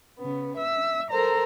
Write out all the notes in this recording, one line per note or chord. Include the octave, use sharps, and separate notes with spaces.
C#3 B3
E5 E6
A4 A#4 C5 A#5